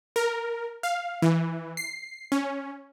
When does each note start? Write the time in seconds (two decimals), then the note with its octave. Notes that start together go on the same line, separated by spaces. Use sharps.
0.16 A#4
0.83 F5
1.22 E3
1.77 C7
2.32 C#4